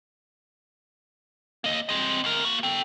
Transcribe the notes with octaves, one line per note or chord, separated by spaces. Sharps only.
A#3 D#5
C4 D#5
D2 A#4
A#3 F#4
A4 G5